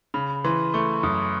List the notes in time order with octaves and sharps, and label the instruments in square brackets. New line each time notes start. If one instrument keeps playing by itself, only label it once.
[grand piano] C#3 [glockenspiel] B5
[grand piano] E3 [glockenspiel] C6
[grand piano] A3 [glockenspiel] C#6
[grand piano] F#2 [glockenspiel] D#6